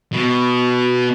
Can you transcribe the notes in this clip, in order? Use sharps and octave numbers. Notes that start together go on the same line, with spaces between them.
B2